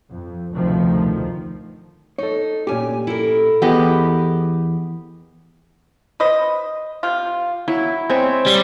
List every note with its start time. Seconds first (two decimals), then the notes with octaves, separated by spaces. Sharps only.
0.11 F2
0.53 F1 D2 B2 D#3 F3
2.18 D#4 A4 C#5
2.67 D2 A#2 C#4 G4 G#5
3.07 E4 A4 A#4
3.62 E2 E3 B3 G4 G#4 D#5
6.20 B4 C5 D#5
7.03 C3 F4
7.68 F#3 E4
8.10 G#3 C4 C#5 E5
8.46 G3